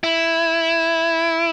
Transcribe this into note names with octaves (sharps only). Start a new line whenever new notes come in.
E4